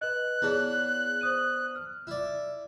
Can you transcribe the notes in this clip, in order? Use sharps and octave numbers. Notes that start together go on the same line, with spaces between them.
B4 D#5 F#6
B3 D4 E4 G#4 C#5
C5 D#6 D#7
F6
E4 D5